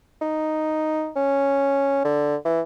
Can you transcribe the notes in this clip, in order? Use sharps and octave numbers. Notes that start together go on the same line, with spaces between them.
D#4
C#4
D3
E3